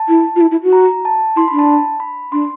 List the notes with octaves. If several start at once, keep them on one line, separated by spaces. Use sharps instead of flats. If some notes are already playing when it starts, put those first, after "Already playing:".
Already playing: A5
E4
F4
E4
E4
F#4
A#5
A5
E4 C6
B5
D4
A5
B5
D4 C6